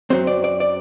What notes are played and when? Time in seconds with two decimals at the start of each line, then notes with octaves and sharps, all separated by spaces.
0.10 F#2 F#3 C4 C5
0.27 D5
0.44 D5
0.60 D5